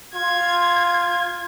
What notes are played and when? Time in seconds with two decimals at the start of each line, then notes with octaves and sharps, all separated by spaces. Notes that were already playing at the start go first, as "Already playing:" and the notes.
0.14 F4 G#6